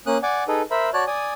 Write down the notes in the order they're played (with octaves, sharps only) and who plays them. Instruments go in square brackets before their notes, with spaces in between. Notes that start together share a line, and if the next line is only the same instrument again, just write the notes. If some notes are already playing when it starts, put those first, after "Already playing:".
[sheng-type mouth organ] A#3 C#4 D#6 F#6
D5 F#5 G#5 D6
D#4 G#4 A4 B4
A#4 C5 E5 B5
F#4 C#5 D5 A5 F#6
D5 G#5 D#6